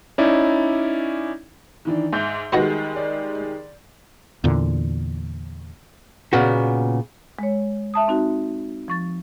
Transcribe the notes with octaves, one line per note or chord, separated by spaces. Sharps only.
C#4 D#4 E4 D5
D#3 E3 D4
G#2 E5 G6
D#3 G3 G#3 B3 F#4 D#5
D5
E2 A#2 D3
A#2 C#3 B3 F#4
G#3 C#5
E5 A5 D#6
C4 D#4 F#4
F3 C#6 A6